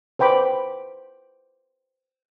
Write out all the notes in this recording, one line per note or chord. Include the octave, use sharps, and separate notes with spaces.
B4 C5 G5 B5 D6